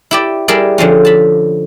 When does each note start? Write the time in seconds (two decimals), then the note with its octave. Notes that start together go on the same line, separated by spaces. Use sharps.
0.11 E4 G4 D5
0.48 G3 E4 G4 G#4 A#4 D5
0.78 D3 F3 C4 C#4
1.05 A5 B5